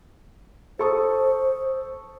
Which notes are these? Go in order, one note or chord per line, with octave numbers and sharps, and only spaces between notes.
A4 C5 C#6 D#6